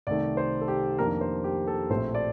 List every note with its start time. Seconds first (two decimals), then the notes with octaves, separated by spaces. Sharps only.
0.07 C2 C3 D#3 A3 D5
0.37 C5
0.61 A4
0.68 G4
0.99 F2 D#3 A#3 D4 A#4
1.21 C5
1.44 G4
1.67 A4
1.90 A#1 A2 A3 C4 C5
2.15 D5